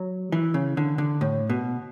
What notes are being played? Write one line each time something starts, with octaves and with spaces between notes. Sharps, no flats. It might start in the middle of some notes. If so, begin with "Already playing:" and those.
Already playing: F#3
E3
C#3
D3
D3
A2
B2